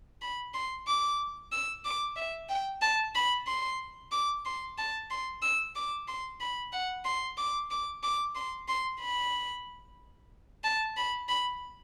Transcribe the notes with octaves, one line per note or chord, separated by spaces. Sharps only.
B5
C6
D6
E6
D6
E5
G5
A5
B5
C6
D6
C6
A5
C6
E6
D6
C6
B5
F#5
C6
D6
D6
D6
C6
C6
B5
A5
B5
B5